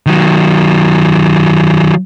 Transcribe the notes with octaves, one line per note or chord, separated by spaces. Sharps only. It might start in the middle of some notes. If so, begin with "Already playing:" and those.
D#3 F#3